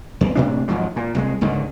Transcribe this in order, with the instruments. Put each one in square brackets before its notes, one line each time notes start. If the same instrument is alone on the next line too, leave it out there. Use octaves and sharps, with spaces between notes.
[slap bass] E2
A2 C3 D4
G#1 G#2 F3 F#3
A#2
C2 F#3 G#3
C#2 G#2 D3 D#3